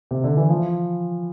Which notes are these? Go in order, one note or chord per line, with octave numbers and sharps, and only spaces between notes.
C3
D3
E3
F3